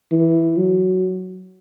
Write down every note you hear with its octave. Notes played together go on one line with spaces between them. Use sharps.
E3
F#3